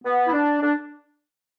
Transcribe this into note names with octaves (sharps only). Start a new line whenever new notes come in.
B3
E4
D4
D4